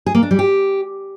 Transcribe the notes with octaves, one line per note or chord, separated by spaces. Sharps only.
G#4
A#3
D4
G3
G4